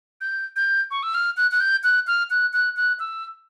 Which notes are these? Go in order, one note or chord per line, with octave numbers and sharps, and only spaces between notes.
G6
G6
C#6
E6
F6
F#6
F#6
G6
F#6
F6
F#6
F#6
F#6
E6